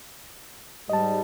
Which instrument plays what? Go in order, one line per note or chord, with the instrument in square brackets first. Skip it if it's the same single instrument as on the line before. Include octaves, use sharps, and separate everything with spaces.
[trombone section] G#2 G3 [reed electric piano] D#5 A5